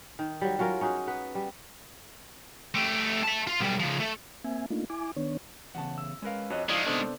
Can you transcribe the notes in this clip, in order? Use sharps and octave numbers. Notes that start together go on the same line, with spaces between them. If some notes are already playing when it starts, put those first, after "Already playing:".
D#3
F#3 G3
F#3 C#4 F4 A#4
C#4 D#4 F#4 G#4
B3 B4
G3
A3 G4
E5 A5
F4
B1 G3
C#3 F3
A3
A#3 C4 E5 G#5
A3 A#3 D4 D#4 F4
E4 G#5 D6
D#3 B3 D4 C#5
E2 A2 C#3 F#5 A5
E6
G#3 C#4 A#4 B4 F5
F2 F#4 C#5 D#5 F#6
D#3 F3 G#3 E4 F4 D5
C3 B3 D4 A4 C5 D5